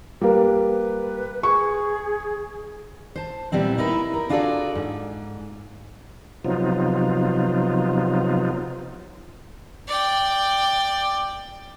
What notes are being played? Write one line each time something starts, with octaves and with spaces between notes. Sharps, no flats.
G3 A#3 B4
B4
G#4 C#6
C5 A5
A#2 G3 B3 C4 E4
D#4 E4 A#4 B4
A#4
D4 F4 F#4 G#4 A4 D5
G#2
C3 F3 F#3 B3 D#4 F4
D5 G5